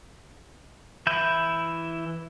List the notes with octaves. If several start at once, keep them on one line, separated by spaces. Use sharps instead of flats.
E3 E4 G6